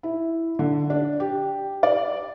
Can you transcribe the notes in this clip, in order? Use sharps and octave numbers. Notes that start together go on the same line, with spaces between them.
E4
D3
D4
G4
D5